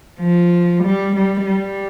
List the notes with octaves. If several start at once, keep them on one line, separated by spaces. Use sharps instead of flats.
F3
G3
G3
G3